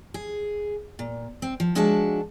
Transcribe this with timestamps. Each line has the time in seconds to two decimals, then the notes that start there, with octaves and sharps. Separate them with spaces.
0.14 G#4
0.99 A#2
1.42 C4
1.60 F3
1.75 F3 G#3 D4 F#4 E5 A5